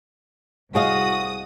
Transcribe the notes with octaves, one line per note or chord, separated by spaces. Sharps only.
C2 F#4 G#4 D#5 F5 D#6